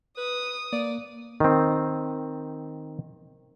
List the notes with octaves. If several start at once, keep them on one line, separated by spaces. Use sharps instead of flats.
B4 D#6
A#3 D5
D#3 C4